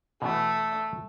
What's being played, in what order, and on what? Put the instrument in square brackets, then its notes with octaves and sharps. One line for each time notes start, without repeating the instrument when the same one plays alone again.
[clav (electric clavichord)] B2 E3 B3 [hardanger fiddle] A3